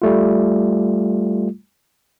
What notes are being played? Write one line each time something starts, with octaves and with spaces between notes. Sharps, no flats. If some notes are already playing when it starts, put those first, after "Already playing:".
G3 A3 F4